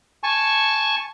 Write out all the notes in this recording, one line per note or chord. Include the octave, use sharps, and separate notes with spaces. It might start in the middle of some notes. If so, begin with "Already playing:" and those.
G#5 A5 C#6